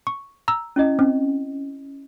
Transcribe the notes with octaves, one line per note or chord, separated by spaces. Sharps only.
C#6
A#5 E6
C#4 E4 D#5
C4 C#4